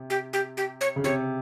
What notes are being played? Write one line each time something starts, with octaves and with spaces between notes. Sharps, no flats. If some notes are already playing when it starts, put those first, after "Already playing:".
Already playing: C3
G4
G4
G4
C#5
C#3
C3 C#5